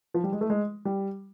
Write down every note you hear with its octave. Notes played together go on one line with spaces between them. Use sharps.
F3
G3
G#3
A3
G#3
G3